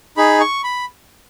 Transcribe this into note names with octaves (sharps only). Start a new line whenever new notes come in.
D#4 G#4 B5
C#6
B5